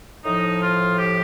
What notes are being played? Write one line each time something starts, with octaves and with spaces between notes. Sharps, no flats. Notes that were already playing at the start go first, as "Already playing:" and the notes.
A2 F3 D#4
F4
G4